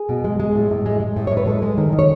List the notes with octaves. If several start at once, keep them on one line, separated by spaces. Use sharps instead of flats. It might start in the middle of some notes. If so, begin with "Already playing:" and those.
Already playing: G#4
B2
G#3
G#3
A2
A2
G#3
G#3
A2
A2 C#5
B4
G#3 A4
G#3
D#3
D#3
C#5